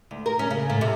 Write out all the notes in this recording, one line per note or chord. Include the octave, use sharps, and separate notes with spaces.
D2
A#4
C#4
C#3
A2
C3